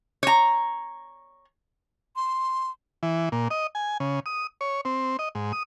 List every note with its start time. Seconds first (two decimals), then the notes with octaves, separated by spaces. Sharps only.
0.23 C#5 A#5
2.16 C6
3.03 E3
3.32 A#2
3.51 D#5
3.75 G#5
4.00 C#3
4.26 D#6
4.61 C#5
4.85 C4
5.19 D#5
5.35 G#2
5.53 D#6